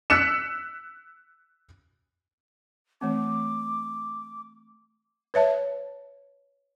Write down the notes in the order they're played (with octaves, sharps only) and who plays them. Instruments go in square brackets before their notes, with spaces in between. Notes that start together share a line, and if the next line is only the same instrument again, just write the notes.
[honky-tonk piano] E6 F#6 B6 C#7 E7
[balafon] E3 A3 C4 [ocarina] D6
[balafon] B4 C#5 E5 A5